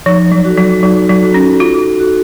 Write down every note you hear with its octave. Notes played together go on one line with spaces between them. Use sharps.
F3 D#4
F#3
F#4 A4
F#3
F#3 D#4
F#3
F#4 A4
C#4
D#4 F4
F#4 A4